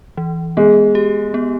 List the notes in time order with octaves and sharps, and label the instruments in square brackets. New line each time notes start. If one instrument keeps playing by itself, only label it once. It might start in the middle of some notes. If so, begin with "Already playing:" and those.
[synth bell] E3
[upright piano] G#3 [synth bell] B3
[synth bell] G4
B3